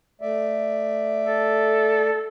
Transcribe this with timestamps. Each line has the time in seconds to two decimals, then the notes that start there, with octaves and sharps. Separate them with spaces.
0.22 A3 D5 E5
1.25 A4